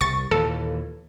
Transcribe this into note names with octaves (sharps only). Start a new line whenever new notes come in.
C2 C#6 A6
D#2 A#2 E3 A4